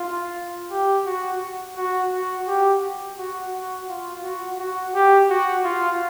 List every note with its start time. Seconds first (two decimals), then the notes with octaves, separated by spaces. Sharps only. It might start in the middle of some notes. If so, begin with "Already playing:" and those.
Already playing: F4
0.71 G4
1.06 F#4
1.77 F#4
2.12 F#4
2.48 G4
3.19 F#4
3.54 F#4
3.89 F4
4.24 F#4
4.60 F#4
4.95 G4
5.30 F#4
5.65 F4